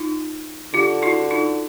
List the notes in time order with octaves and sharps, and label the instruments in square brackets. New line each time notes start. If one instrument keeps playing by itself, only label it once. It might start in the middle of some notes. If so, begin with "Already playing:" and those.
Already playing: [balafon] D#4 F4
[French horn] D3 [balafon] F4 G4
[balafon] E4 F#4
D#4 F4